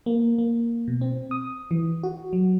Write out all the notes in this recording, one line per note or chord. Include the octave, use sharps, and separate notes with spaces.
A#3
A#3
B2
C4
D#6
E3
F#4
F#3